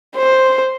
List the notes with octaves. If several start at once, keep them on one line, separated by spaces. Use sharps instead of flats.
C5